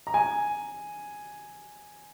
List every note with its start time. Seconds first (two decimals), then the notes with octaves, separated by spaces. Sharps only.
0.07 A#5
0.14 G#5